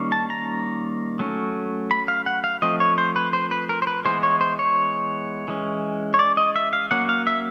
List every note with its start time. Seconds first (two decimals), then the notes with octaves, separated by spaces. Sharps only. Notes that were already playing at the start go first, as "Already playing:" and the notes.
Already playing: D#3 G3 A#3 C#4
0.12 A5
0.30 A#5
1.19 F#3 A3 C#4
1.91 B5
2.08 F5
2.26 F#5
2.44 F5
2.62 F3 A3 C4 D#5
2.80 C#5
2.98 C5
3.16 B4
3.33 C5
3.51 B4
3.69 A#4
3.82 C5
3.87 B4
4.05 E3 G#3 B3 C5
4.23 C#5
4.41 C5
4.59 C#5
5.48 E3 G#3 C#4
6.14 C#5
6.19 D5
6.37 D#5
6.56 E5
6.73 F5
6.91 F#3 A#3 C#4 F#5
7.09 F5
7.27 E5